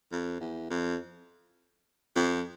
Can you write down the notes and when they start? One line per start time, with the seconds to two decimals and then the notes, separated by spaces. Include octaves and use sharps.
0.12 F2
0.40 E2
0.70 F2
2.16 F2